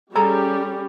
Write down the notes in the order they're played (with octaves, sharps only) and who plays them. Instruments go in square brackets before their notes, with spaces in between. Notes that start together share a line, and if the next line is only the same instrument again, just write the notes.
[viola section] G3 C#4 [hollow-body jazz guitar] G#4 A4 A#5